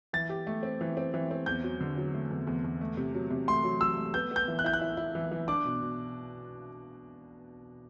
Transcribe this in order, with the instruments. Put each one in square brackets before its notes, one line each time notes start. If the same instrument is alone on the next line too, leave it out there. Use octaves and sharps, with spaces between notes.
[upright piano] E3 [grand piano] A6
[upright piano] G4
A3
C4
E3
C4
E3
C4
[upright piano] E2 [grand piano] G6
[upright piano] F#3
D3
F#3
A3
E2
E2
E2
A3
C3
F#3
C3
[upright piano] A3 [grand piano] C6
[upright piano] F#3
[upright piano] F#3 [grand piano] E6
[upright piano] A3
[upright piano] B3 [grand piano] G6
[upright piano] B3 [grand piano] G6
[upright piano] E3
[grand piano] F#6
[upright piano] E4 [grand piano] G6
[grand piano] F#6
[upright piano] E4
E4
E3
E3
[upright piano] D4 [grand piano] D6
[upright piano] B2
B2